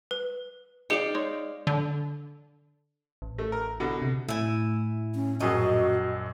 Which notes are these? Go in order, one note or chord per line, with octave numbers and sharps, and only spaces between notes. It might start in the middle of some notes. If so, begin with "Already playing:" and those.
B4
D#4 G#4 D5 F5 G5 C#7
G#3 D#4 C#5
D3
A1
A1 A3
A#4
B2 D3
C3
A2 E4 G#5
C#4
A#1 F#2 F#4 G#4 D#5